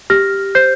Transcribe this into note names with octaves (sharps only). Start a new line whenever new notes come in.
G4 F6 A#6
C5 G6 C7